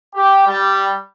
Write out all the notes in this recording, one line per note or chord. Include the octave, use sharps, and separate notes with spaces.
G4
G3